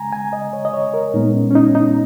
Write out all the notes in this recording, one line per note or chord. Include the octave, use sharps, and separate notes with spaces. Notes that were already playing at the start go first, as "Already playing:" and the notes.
Already playing: C#3 G#3 G#5 A#5
G#5
D#5
C#5
D#5
C#5
A#4
A#2 G#3 B3 D#4
C#4
C#4
D#4
D#4